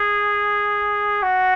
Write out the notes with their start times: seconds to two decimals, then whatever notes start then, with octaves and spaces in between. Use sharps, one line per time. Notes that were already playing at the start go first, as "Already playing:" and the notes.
Already playing: G#4
1.23 F#4